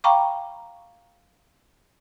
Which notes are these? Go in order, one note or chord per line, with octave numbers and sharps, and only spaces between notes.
F5 G5 A#5 B5 C#6 D6